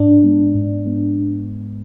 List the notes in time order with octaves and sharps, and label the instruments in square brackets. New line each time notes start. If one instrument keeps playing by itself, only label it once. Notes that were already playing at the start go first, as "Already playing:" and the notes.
Already playing: [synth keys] G#2 [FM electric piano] D4
[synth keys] G#3 B3
G#2
G#3 B3